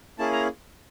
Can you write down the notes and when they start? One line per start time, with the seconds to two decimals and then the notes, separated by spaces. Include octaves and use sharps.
0.19 A#3 C#4 E4 G#4 A5
0.33 A#5